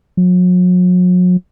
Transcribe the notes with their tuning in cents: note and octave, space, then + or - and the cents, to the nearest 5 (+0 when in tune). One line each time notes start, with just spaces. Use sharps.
F#3 -40